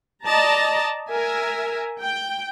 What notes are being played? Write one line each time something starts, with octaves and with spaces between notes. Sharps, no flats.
D5 D#5 A5 A#5
A#4 E5 G#5
G5